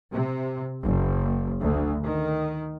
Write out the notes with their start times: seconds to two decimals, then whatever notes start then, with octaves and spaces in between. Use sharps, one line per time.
0.13 C3
0.82 F#1
1.62 D2
2.03 D#3